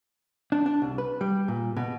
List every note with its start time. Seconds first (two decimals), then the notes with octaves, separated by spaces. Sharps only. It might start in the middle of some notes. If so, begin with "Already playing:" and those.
0.52 D4
0.66 D4
0.82 C2
0.98 B4
1.21 G3
1.48 A#2
1.76 B2